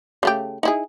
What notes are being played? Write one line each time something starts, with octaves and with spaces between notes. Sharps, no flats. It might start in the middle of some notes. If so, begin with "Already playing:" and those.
C#3 A3 G4
D#4 E4 G#4